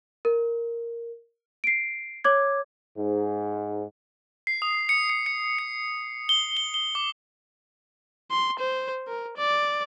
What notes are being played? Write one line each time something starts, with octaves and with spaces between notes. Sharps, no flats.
A#4
C7 D7
C#5 D6 G#6
G#2
C7
D#6
C#7
C#7
C#7
C#7
G7
G7
G7
D6
C6
C5
A#4
D5